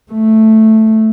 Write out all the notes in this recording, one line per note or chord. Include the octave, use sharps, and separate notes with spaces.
A3